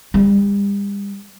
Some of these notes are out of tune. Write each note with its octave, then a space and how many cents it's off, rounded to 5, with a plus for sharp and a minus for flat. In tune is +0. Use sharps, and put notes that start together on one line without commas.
G3 +40